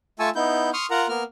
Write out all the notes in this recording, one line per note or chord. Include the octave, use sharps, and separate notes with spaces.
A3 F4 G#5 A5 C#6 E6
B3 D#4 E4 G6
C6 C#6 D#6 F6
F4 A#4 F#5 A#5
A#3 B3 A#4 F6